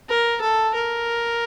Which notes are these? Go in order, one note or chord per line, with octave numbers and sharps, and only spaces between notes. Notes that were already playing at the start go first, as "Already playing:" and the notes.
A#4
A4
A#4